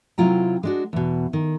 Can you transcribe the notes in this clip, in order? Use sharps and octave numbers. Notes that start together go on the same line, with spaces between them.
C3 F#3 E4 F4 G5 A#5
G#3 D4 F#4
E2 B2
D#3